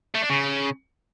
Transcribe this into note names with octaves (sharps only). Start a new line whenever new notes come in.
A3
D4
C#3